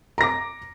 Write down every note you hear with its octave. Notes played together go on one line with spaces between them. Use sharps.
A#5 D6 A#6